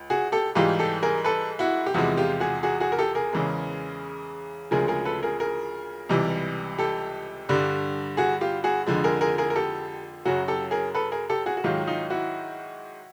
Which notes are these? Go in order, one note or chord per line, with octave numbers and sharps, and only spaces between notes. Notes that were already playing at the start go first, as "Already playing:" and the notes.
Already playing: C#2
F#4 G#4
G4 A4
G#2 E3 G3 F4 G4
G4 A4
G#4 A#4
A4 B4
E4 F#4
G4
E2 C3 F3 G#3 E4 F#4
F4 G4
F#4 G#4
F#4 G#4
F#4 G#4
A#4
G4 A4
G#4 A#4
E2 C#3 E3 G#3
D2 C#3 F3 G#3 G#4 A#4
G#4 A#4
A4 B4
G#4 A#4
G#4 A#4
C#2 C3 E3 G3
G4 A4
G2 D3 G3
F#4 G#4
F4 G4
F#4 G#4
F2 D3 F3 G#3
G#4 A#4
G#4 A#4
G#4 A#4
A#4
G4 A4
F#2 C#3 F#3 F#4 G#4
G4 A4
G#4 A#4
A4 B4
G#4 A#4
G4 A4
F#4 G#4
F#4
G#2 D#3 F#3 F4 G4
D#4 F4
E4 F#4